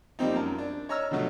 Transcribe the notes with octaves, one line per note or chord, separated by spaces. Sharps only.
F3 G3 A#3 C4 D#4
F#2 A#4 A5
D4
C#5 D#5 A#5 C#6 E6 F6
B2 D3 F3 F#3 A3